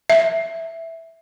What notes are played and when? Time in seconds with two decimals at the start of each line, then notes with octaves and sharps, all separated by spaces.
0.10 E5